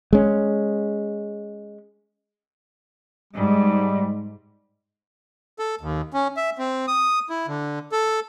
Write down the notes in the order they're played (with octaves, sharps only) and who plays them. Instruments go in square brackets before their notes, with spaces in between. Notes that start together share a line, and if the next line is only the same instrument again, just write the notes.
[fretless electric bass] G#3 C#4
[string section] G#2 [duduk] G3
[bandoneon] A4
D#2
C#4
E5
C4
D#6
E4
D3
A4